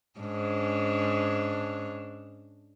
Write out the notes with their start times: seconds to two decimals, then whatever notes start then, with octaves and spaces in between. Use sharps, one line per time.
0.20 G#2 C#4 D4